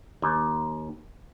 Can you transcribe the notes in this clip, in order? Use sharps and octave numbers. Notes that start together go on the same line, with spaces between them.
D#2